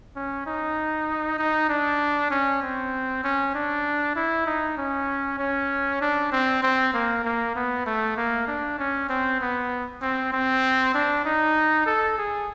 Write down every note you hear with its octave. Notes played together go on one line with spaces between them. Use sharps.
C#4
D#4
D#4
D4
C#4
C4
C#4
D4
E4
D#4
C#4
C#4
D4
C4
C4
A#3
A#3
B3
A3
A#3
D4
C#4
C4
B3
C4
C4
D4
D#4
A4
G#4